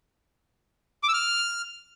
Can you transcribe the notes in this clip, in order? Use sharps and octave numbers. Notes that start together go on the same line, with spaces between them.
D6
E6
F6